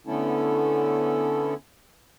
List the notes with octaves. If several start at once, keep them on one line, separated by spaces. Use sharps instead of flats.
D3 A3 B3 C#4 E4 A4